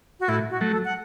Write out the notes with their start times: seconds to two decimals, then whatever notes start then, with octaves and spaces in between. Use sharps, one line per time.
0.20 F#4
0.28 A2 E4
0.50 F#4
0.61 F#3 A3
0.71 A4
0.85 F#5